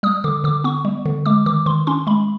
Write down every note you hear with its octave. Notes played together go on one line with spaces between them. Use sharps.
G3 D#6
D3 D6
D3 D6
B3 C#6
G3
D3
G#3 D6
D#3 D6
D#3 C6
C#4 C6
G#3 B5